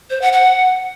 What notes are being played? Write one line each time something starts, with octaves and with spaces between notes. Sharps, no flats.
C5
F#5
F#5